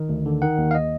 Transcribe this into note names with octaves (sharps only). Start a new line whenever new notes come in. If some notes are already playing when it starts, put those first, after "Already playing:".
Already playing: D#3
D2
D3
D#3 F#5
D#2
F5
D#5